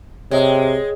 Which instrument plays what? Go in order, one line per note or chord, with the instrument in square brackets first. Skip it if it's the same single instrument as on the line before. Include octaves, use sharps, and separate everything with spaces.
[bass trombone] C3 [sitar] G#3 [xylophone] C#5 D#5 G5